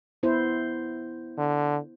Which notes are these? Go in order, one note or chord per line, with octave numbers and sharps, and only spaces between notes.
B3 E4 C5
D3